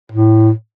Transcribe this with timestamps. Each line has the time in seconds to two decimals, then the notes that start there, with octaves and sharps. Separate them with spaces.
0.12 A2